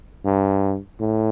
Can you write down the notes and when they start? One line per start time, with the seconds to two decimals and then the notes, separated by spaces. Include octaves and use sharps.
0.25 G2
1.00 A2